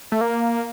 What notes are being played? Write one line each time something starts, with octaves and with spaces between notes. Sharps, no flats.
A3
A#3